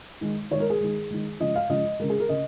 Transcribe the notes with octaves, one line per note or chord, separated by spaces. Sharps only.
D#3 G#3
D#3 G#3 A#4 C#5
G#4
D#3 G#3
D#3 G#3
C#3 F3 G#3 D#5
F5
C#3 F3 G#3 D#5
C#3 G#3 A#4
G#4
A#4
C#3 D#5